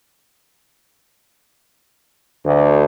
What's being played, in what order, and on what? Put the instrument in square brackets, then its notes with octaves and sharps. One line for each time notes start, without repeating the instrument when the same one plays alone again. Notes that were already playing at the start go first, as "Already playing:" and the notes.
[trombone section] D2